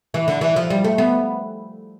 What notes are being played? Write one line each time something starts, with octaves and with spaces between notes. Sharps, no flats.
E3
D3
E3
F3
G3
A3
B3